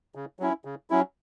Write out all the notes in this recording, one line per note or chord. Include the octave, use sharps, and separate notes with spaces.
C#3
F#3 C#4 E4
C#3
F#3 C#4 E4